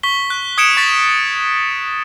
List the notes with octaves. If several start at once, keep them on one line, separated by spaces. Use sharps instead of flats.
C#6 B6 G7
F#6
D#6 G#6 C#7 D7 E7
C#6 A6 B6